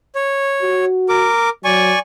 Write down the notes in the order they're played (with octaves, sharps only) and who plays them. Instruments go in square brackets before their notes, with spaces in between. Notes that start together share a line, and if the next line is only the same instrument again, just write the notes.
[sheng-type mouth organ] C#5
[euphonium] F#4
[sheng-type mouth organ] A#4 D6
[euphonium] F#3 [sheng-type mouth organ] D5 G#5 C#6